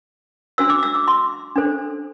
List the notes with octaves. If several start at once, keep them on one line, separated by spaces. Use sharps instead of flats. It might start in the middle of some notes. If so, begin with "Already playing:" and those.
D4 F#4 C5 E6
D6
E6
D6
C6
D4 A4 C5